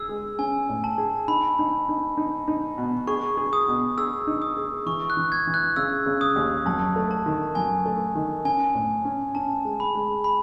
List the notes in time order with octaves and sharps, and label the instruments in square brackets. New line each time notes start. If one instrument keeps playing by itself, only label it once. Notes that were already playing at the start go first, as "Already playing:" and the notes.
Already playing: [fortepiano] G#4 [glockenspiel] E6
[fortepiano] G#3
[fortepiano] C#4 [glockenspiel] G#5
[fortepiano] A2
[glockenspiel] A5
[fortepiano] G#4
[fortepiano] D#4 [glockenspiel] B5
[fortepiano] D#4
D#4
D#4
D#4
B2
[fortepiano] G#4 [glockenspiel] C#6
[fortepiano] G#4
[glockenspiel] D#6
[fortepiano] B2
[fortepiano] G#4 [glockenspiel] E6
[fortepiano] D#4
[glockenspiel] D#6
[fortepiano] G#4
[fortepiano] E3 [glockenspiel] C#6
[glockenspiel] F#6
[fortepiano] E3
[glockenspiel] G#6
[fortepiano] E3
[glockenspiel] F#6
[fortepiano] C#3 [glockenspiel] E6
[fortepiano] C#3
[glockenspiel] D#6
[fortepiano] D#2
[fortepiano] F#2 [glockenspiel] A5
[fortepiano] A3
[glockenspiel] A5
[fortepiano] D#3
[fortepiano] F#2 [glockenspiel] G#5
[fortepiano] A3
D#3
[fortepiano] C#4 [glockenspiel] G#5
[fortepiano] A2
C#4
[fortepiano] C#4 [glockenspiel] A5
[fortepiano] G#3
[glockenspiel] B5
[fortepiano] G#3
[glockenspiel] B5